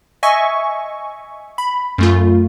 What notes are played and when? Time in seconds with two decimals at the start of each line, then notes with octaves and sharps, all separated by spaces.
0.23 D#5 E5 G#5 C#6
1.58 B5
1.98 F#2 A3 F4